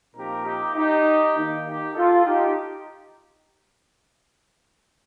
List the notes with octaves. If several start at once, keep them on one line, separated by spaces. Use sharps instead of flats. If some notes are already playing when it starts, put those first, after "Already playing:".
A#2 F3 C4 D#4 G4 A#4
D#4 G4
D#4 G4
D#3 A#3 D#4
D#4 G4
F4 A4
D#4 G4